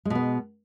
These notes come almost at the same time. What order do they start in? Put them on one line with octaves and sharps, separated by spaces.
G#3 B2 B3